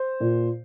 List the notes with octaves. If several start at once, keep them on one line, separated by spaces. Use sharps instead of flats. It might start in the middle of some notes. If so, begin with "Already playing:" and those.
Already playing: C5
A#2